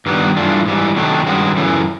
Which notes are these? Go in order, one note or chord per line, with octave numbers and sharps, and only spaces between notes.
G2 D#3 G3 B3
G2 E3 A3 D4 F4
G#2 E3 G3
C3 D#3 F#3 A3 D4
G2 D#3 G#3 C#4 F#4
F#2 C#3 E3 A3